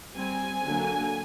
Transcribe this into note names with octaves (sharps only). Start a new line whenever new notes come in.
G3 C4 G#5
D3 F#3 A#3